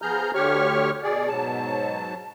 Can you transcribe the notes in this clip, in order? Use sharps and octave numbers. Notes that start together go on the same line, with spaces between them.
F3 B3 G#4 A#5 F6 G6
D2 D3 G4 C#5 C#6 F6
B2 G#4 D5
G#2 B2 F#3 A5